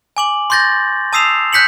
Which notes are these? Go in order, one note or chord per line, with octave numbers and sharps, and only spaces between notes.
G#5 D6 F#7
C6 C#6 G6 A6 A#6
A5 D#6 E6 C7 E7 F7
F#6 G6 B6 C#7 F#7